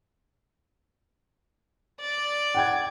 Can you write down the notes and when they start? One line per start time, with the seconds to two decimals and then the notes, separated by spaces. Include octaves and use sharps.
2.00 D5
2.55 F#5 G5 G#6